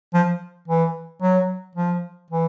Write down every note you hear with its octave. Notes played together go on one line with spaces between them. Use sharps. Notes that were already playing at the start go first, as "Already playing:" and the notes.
F3
E3
F#3
F3
E3